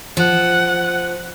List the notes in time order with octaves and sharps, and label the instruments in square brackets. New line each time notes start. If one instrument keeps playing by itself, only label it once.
[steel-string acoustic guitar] F3 [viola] F#5